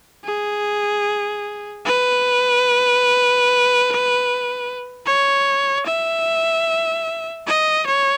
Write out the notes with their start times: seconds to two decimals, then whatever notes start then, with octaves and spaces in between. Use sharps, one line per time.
0.24 G#4
1.85 B4
5.06 C#5
5.86 E5
7.47 D#5
7.86 C#5